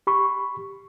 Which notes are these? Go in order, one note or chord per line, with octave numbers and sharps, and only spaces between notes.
G4 B5 C#6